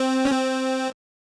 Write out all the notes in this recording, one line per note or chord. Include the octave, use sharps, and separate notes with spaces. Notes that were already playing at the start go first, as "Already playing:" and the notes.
Already playing: C4
C#4
C4